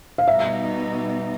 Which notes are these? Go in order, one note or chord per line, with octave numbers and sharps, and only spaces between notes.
F5
B2 G3 B3 D#4 E5